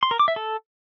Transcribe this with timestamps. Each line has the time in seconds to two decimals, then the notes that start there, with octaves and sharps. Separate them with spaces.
0.03 C6
0.11 A#4
0.19 D6
0.28 E5
0.36 A4